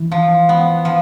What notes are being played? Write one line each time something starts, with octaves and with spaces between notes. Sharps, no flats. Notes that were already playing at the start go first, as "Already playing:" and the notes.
Already playing: E3
F3
B3
F3